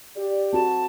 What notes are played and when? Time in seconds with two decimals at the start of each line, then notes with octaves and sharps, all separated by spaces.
0.16 G4 D5
0.53 C4 F#4 A4 A5